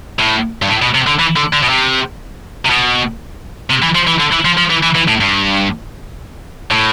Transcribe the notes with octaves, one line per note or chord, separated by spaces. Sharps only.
A2
G2
A2
B2
C3
D3
E3
D3
D3
B2
C3
C3
B2
C3
E3
F3
E3
D3
E3
F3
F3
E3
E3
E3
A2
G2
A2